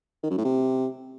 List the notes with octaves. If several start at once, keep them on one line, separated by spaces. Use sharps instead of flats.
D#3
F#2
A2
C3